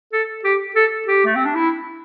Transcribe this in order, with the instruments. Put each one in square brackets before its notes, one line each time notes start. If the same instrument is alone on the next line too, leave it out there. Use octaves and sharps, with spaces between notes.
[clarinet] A4
G4
A4
G4
A3
C4
D4
E4